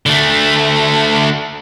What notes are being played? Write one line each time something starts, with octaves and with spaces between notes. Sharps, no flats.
D3 A3